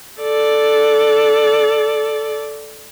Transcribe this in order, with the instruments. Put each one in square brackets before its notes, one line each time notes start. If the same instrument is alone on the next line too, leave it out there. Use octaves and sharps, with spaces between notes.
[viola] A4 D5